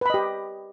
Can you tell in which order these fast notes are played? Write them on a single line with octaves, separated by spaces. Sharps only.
B4 B5 D#5 G4